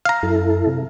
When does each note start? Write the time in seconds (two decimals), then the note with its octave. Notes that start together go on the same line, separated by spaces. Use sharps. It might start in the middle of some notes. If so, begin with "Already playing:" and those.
0.05 F5 A#5
0.23 F#2 E4 A4
0.67 C3